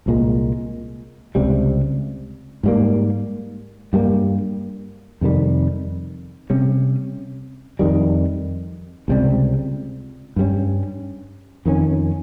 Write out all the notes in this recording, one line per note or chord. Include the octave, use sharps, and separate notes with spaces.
C2 A#2 G#3
C#2 C3 G3
G#2 G3 A#3
G2 G3 A#3
F2 C3 D#3 G3
C3 G3 C#4
F2 D#3 G3
C#2 C3 G3
G2 G3 C#4
F2 D#3 A#3 C#4